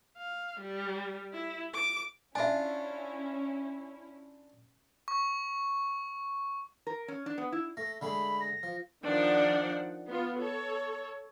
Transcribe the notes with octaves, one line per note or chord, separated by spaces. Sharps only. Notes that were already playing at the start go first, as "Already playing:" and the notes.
F5
G3
E4
D6
C#4 D4 E4 F4 E5 G#5
C#6
A#4
C#4
D4
B3
E4
A3 A#6
D3 G#3 A3 B5
A#6
F3
D#3 F3 D4 D5 F#5
B3 F4
A4 C#5